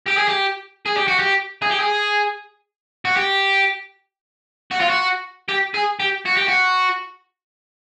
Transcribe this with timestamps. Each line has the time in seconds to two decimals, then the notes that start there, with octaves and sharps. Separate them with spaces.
0.08 G4
0.18 G#4
0.29 G4
0.86 G#4
0.97 G4
1.08 F#4
1.19 G4
1.62 G#4
1.71 G4
1.80 G#4
3.05 F#4
3.17 G4
4.71 F#4
4.80 F4
4.89 F#4
5.48 G4
5.74 G#4
6.00 G4
6.26 F#4
6.37 G4
6.48 F#4